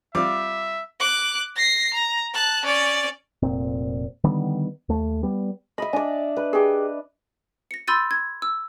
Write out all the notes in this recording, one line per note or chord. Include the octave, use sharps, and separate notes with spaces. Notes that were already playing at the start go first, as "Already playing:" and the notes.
G3 C4 F4 E5 D6
D6 F#6
A#6 C7
A#5
A5 F#6
C#4 D5
F1 A#2 C4
D3 D#3 G3 B3
D#2 A3
G3 B3
D#5 E5 B5
D4 D5 G#5
B4
G4 G#4
A#6 C#7
B5 C6 E6 G6 A6 D#7
G#6
E6